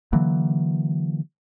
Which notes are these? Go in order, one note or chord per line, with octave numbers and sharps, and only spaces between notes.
D3 E3 F#3 A#3